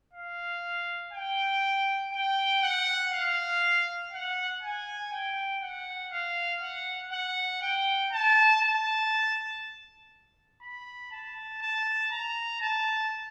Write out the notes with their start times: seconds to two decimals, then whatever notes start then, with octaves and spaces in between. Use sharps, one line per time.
0.13 F5
1.13 G5
2.12 G5
2.62 F#5
3.13 F5
4.12 F#5
4.63 G#5
5.12 G5
5.62 F#5
6.12 F5
6.62 F#5
7.12 F#5
7.62 G5
8.13 A5
8.62 A5
10.62 B5
11.12 A5
11.62 A5
12.12 A#5
12.61 A5